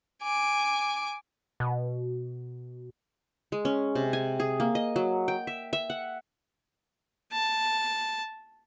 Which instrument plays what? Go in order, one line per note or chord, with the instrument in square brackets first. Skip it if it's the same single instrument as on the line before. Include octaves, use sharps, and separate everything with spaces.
[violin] G#5 D6
[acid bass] B2
[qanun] G#3
C#4
C3
G#5
G#4
A#3
D#5
F#3
G5
E5
E5
F#5
[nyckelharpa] A5